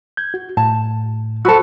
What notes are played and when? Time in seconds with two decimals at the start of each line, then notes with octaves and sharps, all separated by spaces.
0.17 G6 G#6
0.34 F#4
0.57 A2 A5
1.45 F#4 A4 C5 B5 E6